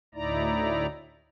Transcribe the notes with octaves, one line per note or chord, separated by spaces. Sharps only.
D2 A2 D#4 E4 D5 A#5